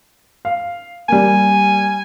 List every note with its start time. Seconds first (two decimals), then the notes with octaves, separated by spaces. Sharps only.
0.45 F5
1.09 G3 A#3 G#5